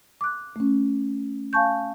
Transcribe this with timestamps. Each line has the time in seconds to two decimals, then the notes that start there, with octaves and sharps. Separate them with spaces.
0.21 D6 F#6
0.56 A3 C#4
1.53 F5 G#5 A5 C#6 G6